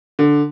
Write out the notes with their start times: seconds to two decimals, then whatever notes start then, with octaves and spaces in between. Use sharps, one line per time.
0.19 D3